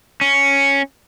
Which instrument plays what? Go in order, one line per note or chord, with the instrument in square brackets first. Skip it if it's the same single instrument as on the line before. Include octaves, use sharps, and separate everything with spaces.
[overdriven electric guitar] C#4